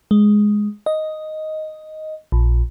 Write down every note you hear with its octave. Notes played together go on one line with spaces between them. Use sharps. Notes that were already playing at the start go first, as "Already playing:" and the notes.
G#3
D#5
A#1